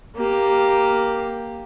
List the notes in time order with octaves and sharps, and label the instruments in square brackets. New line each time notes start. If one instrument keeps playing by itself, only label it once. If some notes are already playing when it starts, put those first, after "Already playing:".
[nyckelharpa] A#3 G4